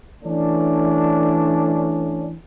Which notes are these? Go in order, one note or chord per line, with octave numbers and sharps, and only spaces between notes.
E3 A3 C#4 D4